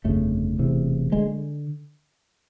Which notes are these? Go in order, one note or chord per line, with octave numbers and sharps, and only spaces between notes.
G1 F2 C#3 A3
E1 E2 C3
D3 G#3